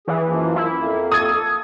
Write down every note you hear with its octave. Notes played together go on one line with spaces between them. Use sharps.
E3 G#4
F#2 F3 A#3
E4
F2 A#3
A4 D#6 G#6